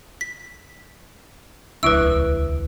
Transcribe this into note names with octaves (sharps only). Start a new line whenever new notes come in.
B6
D#1 C#2 F3 D4 E4 B4 E5 E6